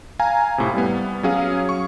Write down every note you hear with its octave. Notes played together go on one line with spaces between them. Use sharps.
F5 G#5 A#5
A2 C3
G3 B3
F#3 C#4 G#4 F5
C#6